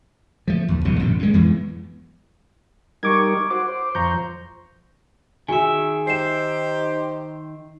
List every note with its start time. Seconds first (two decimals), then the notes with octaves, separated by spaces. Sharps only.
0.48 F3 A3
0.68 D#2
0.85 E1 C2 B2 F#3
1.00 A1 F#2 B2 D3
1.19 G2 G#3
1.33 F2 E3 G#3 B3
3.03 G3 D#4 A#4 C#6 D6 G#6
3.50 F#4 C5 D6
3.68 C5
3.95 F2 C5 A#5 C#6 G6
5.49 D#3 F#4 G#4 E5 G#5
6.07 D#4 G4 C5 C7 E7